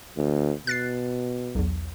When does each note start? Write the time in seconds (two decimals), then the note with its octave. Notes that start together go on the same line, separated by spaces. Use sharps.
0.17 D2
0.67 B2 F#6 A6 C7
1.55 B1 E2